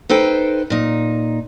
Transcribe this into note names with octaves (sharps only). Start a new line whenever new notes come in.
D#4 A4 B4 C5 G5
A#2 D#4